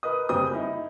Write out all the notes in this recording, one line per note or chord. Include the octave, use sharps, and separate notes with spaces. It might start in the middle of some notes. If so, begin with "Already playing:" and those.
A#4 B4 D#5 D#6
F#1 G3 C4 G5 D#6
D#4 E4